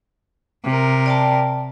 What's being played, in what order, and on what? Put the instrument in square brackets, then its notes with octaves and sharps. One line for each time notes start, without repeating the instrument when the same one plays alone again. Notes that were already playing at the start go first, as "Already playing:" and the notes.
[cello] C3 A#4
[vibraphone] D5 G5 A5